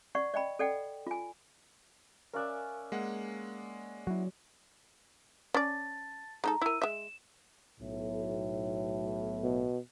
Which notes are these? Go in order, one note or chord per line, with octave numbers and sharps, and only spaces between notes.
D5 F#5 C#6
D5 D#5 G5 B5
A4 D5 F#5 G5
F4 G#5
C#4 A#4 D5 E5 F5 F#6
G#3 A#3 F#5
F#3 E4 F#4
C#4 D5 A5 A6
G#3 D#4 A4 A#5
E4 A#4 E6 D#7
G#3 E5 E7
B1 A2
B2